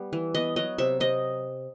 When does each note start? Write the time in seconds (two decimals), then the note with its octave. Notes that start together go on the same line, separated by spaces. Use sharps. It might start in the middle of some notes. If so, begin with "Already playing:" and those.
Already playing: G3 B3
0.13 E3
0.35 B3 D#5
0.56 F#3 D#5
0.78 C3 E5
1.00 C3 D#5